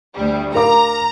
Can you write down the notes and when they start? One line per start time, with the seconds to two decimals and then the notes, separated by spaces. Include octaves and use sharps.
0.15 D2 G3
0.55 A#4 F5 A#5 D6